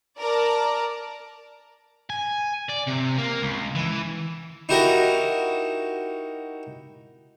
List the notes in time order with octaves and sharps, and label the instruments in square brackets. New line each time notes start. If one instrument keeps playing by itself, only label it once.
[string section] A#4 D5 A5
[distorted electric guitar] G#5
D5
C3
A#3
C#2
E3
[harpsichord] D#4 E4 F#4 G4 A#4 D#5